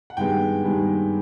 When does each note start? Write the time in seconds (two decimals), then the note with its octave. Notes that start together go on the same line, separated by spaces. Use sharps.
0.10 F#5
0.17 G2 D#3 G#3 B3 G5
0.64 G2 D#3 G#3 B3